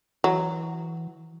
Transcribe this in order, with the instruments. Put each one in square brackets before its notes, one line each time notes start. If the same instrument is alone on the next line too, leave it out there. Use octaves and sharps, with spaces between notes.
[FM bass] E3 [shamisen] F#3